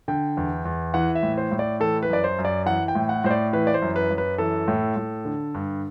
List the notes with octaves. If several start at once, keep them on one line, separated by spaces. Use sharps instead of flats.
D3 G5
E2
E2
E3 F#5
E5
A2
C5
A2
D5
E3 A4
B4
F#2 D5
C5
F#2
D5
E3 F#5
G5
A2
F#5
A2 C5
D5
E3 B4
D5
C5
F#2
B4
F#2
B4
E3 A4
A2
A2
D3
G2